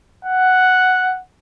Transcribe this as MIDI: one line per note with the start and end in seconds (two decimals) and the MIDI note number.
0.25 1.16 78